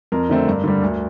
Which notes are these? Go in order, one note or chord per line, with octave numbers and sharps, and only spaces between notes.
F2 A#4
D3 A3 C4
G2
D3 G3
D2